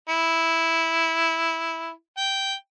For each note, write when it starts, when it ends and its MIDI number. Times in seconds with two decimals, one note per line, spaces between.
0.09 1.90 64
2.17 2.53 79